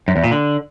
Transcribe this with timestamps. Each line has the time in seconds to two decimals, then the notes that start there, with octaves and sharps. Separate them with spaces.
0.08 F#2
0.16 E2
0.24 A#2
0.31 D3